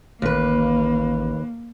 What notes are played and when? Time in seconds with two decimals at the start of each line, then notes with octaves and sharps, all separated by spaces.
0.22 A1 D#2 A#3 B4